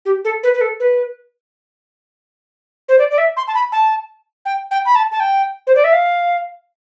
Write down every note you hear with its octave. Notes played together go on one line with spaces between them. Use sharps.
G4
A4
B4
B4
A4
B4
C5
D5
D5
E5
C6
A5
B5
A5
G5
G5
B5
A5
A5
G5
C5
D5
E5
F5